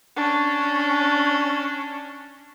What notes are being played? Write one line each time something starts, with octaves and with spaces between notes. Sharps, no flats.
C#4 D4